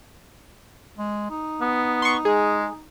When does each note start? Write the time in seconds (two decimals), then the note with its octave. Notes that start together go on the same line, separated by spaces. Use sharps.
0.98 G#3
1.30 D#4
1.61 B3
2.02 C6 C#6
2.25 G#3 G#4